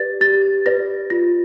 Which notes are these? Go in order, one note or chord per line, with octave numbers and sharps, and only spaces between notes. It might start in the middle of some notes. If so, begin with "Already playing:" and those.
Already playing: G4 B4 D5 A6
G4 A6
B4 D5 A#6
F4 A#6